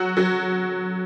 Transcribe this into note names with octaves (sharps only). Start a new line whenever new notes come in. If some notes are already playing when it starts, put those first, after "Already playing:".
Already playing: F#3 F#4
F#3 F#4